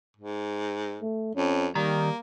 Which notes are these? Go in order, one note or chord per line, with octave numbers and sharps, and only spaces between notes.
G#2
A3
F2 C#4
D#3 G3 A#3 A#5